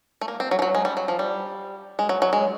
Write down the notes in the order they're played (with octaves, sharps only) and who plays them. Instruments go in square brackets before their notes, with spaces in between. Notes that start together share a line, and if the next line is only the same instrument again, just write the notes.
[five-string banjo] A3
A#3
C4
F#3
F3
F#3
G#3
G3
F#3
F3
G3
G#3
F#3
F#3
G#3